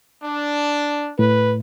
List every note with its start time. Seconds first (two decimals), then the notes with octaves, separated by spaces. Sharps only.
0.22 D4
1.19 A2 B4